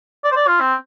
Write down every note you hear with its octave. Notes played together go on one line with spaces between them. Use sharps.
D5
C5
D5
F4
C4